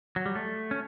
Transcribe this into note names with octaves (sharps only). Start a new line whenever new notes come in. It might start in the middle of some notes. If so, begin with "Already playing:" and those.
F#3
G3
A3
C#4